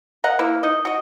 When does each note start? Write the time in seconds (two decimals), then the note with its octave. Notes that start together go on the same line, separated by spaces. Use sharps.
0.24 A#4 D#5 F#5
0.39 A#3 E4 B4
0.63 D#4 D#5
0.85 F#4 D#5